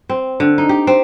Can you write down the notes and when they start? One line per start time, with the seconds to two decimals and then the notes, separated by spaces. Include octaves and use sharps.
0.09 C4
0.40 D3
0.58 D#4
0.69 G4
0.87 C4